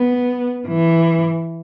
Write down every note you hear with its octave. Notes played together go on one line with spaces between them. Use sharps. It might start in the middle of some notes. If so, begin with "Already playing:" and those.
Already playing: B3
E3